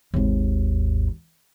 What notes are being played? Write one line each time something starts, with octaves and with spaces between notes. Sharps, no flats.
G#1 D#2